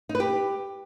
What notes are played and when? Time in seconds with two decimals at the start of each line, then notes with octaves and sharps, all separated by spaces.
0.09 D#4
0.15 B4
0.20 G4